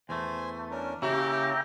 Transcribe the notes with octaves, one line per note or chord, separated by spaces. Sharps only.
E2 A3 C5 G#5
C#4 D4 A#4
C#3 A#3 E4 G4 C#5 E5 G5 A#5